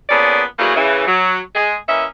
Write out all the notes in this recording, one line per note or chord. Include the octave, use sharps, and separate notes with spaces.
A#2 B3 C#4 G#4 A4 D5
E3 F#3 G3 A3 A#3 G#4
C#3 E3
F#3
G#3 G#4
E3 A#3 C#4 D#5 E5